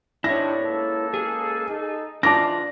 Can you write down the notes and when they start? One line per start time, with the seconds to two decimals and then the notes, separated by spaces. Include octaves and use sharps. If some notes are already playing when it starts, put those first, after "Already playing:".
0.24 C3 D#3 D4 E4 C#5 A#6
0.60 C#2 A#3 A4
1.14 G#4
1.69 D#4 A4
2.23 G#2 E3 D4 F4 D5 A5 D6 A#6